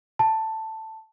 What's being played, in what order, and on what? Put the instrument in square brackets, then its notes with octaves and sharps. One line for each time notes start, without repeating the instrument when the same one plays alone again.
[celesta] A5